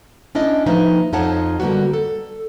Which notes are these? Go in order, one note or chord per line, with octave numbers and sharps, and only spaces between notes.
C#4 D4 E4 D#5
F3 A#3 D#4 B4 E5
F2 F3 D#4 C#5 F#5 A5
D3 G3 A#3 B3 F#4
A4